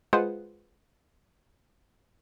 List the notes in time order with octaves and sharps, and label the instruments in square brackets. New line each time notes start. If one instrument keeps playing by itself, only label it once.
[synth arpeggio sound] G#3 F4 G#4 B4 C5 F#5